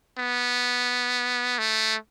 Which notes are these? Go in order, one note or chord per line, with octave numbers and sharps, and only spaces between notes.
B3
A3